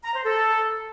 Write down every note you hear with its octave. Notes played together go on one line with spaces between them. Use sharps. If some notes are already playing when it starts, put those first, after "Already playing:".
A#5
C5
A4